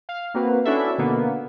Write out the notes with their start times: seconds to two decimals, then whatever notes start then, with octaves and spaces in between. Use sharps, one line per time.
0.09 F5
0.34 A#3 C4 F#4 B4
0.65 C#4 D4 E4 F#4 A4 E5
0.98 B2 D3 A#3 B3